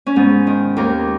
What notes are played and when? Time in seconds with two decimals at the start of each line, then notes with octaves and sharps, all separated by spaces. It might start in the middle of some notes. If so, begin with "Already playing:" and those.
0.07 C#4
0.16 G#2 B3
0.47 D#3
0.77 D#2 A#3 A#4